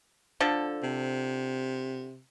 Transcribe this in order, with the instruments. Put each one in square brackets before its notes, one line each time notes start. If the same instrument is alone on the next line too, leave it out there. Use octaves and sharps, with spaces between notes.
[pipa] D3 F3 A4
[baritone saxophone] C3